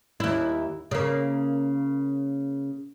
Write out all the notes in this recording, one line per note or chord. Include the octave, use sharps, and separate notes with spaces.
D#2 E4
C#3 A#3